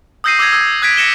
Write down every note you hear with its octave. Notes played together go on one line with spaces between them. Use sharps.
D#6 E6 G6 A#6 C7 D#7
D6 E6 G6 G#6 A#6
D#6 E6 G#6
D#6 F#6 G#6 A#6 B6 D7
A#6 C#7 E7 G7